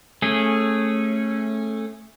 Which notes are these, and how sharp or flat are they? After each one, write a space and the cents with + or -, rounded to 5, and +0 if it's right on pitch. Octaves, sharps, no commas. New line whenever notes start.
A3 +0 C#4 -20 G#4 -5